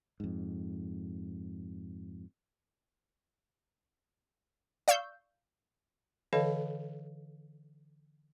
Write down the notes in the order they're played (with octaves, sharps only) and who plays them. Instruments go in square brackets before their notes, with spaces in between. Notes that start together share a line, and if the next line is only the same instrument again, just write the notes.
[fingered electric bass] F2 G#2
[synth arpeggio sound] D5 F5 C#6 E6 G6
[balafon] D3 E3 A4 C#5 D#5 F5